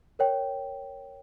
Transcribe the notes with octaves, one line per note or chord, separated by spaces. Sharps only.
A#4 C#5 G5